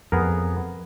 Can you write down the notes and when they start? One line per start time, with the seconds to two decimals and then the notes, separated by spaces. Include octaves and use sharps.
0.12 F2 B3 G#4 A#4